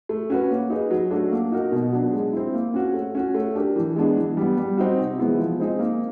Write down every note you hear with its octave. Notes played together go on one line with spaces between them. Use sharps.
A3
C#4 F#4 B4
A#3
D#4 G#4 B4
F#3
A3 D4 F#4
A#3
D#4 F#4 A#4
B2
F#3 B3 D4
G#3
C4 E4
A#3
C#4 F#4
A3
C#4 F#4
A3
D4 G4 A#4
E3
G#3 B3 D4
E3
G3 B3
G3
C4 D#4 F#4
C3
E3 G#3 B3 E4
F3
G#3 C4 D#4 G#4
A#3